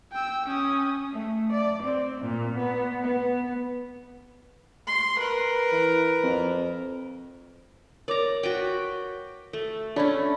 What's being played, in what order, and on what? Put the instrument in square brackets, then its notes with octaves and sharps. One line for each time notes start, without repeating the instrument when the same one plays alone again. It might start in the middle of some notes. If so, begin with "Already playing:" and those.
[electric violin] G5 E6
C#4 D#6
[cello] A3
D5
C4
A#2
B3
B3
[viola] C6
A#4 B4
[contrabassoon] E3
F2
[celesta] A#4 C#5 D6 [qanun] D5 A#5
[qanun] F#4 B4 G5
[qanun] A3 [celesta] A4
[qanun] A3 C#4 [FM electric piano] D4 [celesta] C#5 B5 G#6